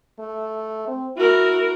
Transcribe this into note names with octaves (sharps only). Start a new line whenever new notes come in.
A3
C4
E4 F#4 A#4